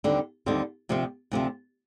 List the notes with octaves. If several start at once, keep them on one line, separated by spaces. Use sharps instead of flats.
D#2 D3 G3 C4
D#2 D3 G3 C4
D2 C3 F3 C4
D2 C3 F3 C4